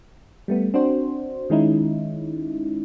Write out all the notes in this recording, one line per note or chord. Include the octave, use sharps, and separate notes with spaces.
G3 A3 B3
C4 D4 F#4 C5
D#3 G#3 C#4 D#4 E4